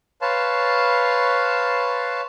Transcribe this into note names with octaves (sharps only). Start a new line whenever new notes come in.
B4 C#5 F5 A5 C6